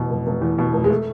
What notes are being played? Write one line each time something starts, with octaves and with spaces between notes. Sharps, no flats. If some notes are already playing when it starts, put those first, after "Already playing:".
Already playing: F1 E2 B2
F1
F1
E2
B2
F1
G#3
A3